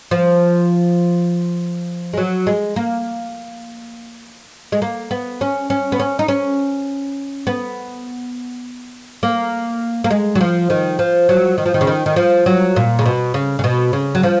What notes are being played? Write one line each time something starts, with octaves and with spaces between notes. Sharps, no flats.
F3
G#3
F#3
G#3
A#3
G#3
A#3
B3
C#4
C#4
B3
C#4
D#4
C#4
B3
A#3
A#3
G#3
F#3
F3
D#3
F3
F#3
D#3
F3
D#3
C#3
D#3
D#3
F3
F#3
A#2
C#3
B2
C#3
C#3
B2
C#3
F#3
F3